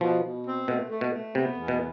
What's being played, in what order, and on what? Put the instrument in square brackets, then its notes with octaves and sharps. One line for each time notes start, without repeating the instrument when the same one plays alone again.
[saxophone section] B2 [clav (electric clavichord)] F3
[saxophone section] B2
C4
[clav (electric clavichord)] B2 [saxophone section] A3
[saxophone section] A3
[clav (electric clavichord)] B2
[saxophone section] A3
[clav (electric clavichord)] C3 [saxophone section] B3
[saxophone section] E2
[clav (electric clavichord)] B2